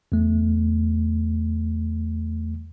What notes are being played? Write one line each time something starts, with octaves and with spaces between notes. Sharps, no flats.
E2 A3